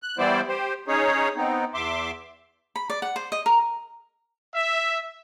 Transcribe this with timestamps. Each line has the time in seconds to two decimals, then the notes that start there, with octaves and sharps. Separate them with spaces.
0.03 F#6
0.18 E3 G3 B3 E4 C5 D5
0.48 G4 C5
0.88 C#4 D#4 G#4 C#5
1.36 B3 C4 D#4
1.74 E2 E5 C6 D6
2.76 B5
2.90 D5
3.02 F#5
3.16 C5
3.32 D#5
3.46 A#4
4.53 E5